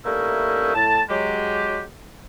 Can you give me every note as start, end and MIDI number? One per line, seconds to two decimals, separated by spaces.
0.05 0.73 55
0.05 0.73 57
0.05 0.73 58
0.05 0.73 61
0.05 0.73 63
0.05 0.73 64
0.75 1.02 45
0.75 1.02 81
1.09 1.82 54
1.09 1.82 56
1.09 1.82 67